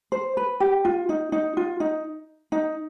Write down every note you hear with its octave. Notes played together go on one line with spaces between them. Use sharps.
C5
B4
G4
F4
D#4
D#4
F4
D#4
D#4